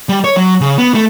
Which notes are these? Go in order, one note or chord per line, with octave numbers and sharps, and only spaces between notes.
G3
C#5
F#3
C#3
B3
A3